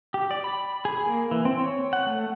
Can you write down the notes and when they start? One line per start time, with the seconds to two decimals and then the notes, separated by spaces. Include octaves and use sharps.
0.14 G4
0.31 D5
0.44 B5
0.85 G#4
1.06 A#3
1.31 E3
1.45 C4
1.60 C#5
1.93 F#5
2.06 A3